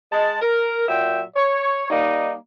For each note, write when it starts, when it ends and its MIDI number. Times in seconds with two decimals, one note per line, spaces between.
0.12 0.40 56
0.12 0.40 81
0.42 0.88 70
0.89 1.21 46
0.89 1.21 54
0.89 1.21 76
0.89 1.21 79
1.36 1.88 73
1.90 2.33 55
1.90 2.33 58
1.90 2.33 63